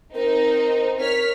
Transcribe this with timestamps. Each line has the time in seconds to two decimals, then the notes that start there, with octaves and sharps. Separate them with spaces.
0.15 C4 D#4 A#4
1.00 A#4 C#5 F6 B6